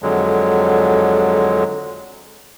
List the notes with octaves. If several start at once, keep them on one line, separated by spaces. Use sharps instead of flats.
F2 D3 F#3 G#3